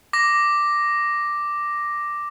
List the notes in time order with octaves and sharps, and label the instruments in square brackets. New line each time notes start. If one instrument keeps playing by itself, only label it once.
[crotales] D6 A#6